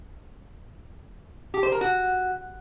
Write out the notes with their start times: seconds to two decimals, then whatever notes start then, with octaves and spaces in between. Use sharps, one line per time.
1.54 G4
1.63 C5
1.72 A#4
1.81 F#4